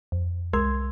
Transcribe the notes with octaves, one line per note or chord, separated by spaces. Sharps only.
F2
C2 G#3 A#4 C6 E6 G#6